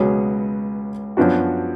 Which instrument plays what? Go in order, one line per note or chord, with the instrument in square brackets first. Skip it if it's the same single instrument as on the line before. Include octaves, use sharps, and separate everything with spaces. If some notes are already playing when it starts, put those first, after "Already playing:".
Already playing: [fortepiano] C#2 B2 F#3 C#4 G#4
F#2 F3 B3 D4 F#4